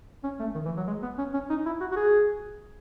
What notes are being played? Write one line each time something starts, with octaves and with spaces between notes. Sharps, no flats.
C#4
A3
D#3
E3
F#3
G#3
B3
C#4
C#4
D#4
E4
F#4
F#4
G#4